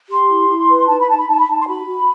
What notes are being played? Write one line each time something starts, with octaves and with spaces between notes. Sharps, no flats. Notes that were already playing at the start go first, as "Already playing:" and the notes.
G4 C6
E4
E4
B4
D#4 A5
B5
D#4 A5
B5
D#4 A5
B5
D#4 A5
C6
F#4 B5
F#4